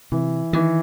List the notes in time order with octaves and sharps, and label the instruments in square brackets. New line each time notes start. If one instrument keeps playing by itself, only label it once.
[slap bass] C3 [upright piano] E3
[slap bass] D#3 [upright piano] E3